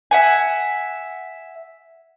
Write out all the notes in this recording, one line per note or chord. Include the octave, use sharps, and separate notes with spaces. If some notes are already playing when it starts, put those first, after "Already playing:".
E5 F#5 G#5